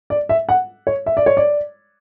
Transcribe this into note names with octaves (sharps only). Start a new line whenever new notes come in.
D5
E5
F#5
C#5
E5
D5
C#5
D5